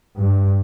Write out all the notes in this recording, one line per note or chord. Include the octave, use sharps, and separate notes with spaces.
G2